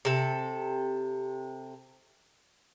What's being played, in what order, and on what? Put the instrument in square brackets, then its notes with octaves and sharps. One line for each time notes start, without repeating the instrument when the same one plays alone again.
[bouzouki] C3 A4